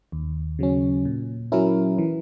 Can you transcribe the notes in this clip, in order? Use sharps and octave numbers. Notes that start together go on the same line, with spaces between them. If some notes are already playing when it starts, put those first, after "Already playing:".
D#2
C#3 F#3 C#4
A#2
F#3 C#4 E4 A#4
E3